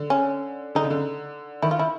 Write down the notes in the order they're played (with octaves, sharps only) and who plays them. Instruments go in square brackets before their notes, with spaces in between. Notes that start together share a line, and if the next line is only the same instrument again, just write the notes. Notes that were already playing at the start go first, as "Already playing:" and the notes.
Already playing: [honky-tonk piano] D3
[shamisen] C#4
[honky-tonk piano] D3 [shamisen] D#4
[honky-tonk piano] C#3
D3
[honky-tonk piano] D#3 [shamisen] E4
[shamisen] F4
E4